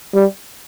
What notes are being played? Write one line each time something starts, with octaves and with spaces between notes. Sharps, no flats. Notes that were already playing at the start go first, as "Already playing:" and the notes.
G3